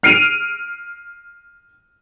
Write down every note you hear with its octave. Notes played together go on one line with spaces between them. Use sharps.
F6 C7 D7 D#7 F7